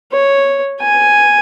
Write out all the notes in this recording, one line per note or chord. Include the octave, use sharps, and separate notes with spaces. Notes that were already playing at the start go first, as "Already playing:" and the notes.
C#5
G#5